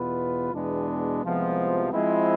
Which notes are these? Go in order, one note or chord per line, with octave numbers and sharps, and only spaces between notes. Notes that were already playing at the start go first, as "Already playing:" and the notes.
Already playing: E2 B2 B3 F4 B4
E2 B2 G#3 B3 D4
C2 C3 F3 G#3 B3
F3 G#3 C4 E4